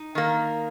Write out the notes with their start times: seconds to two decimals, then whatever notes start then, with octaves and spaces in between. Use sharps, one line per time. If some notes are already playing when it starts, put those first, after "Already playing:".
Already playing: D#4
0.15 D#3 A#3